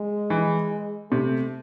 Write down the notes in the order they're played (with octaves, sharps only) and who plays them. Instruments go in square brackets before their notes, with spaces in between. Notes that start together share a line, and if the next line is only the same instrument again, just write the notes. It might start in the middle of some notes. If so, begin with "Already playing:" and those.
Already playing: [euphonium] G#3
[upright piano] E3
[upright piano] C3 [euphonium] A3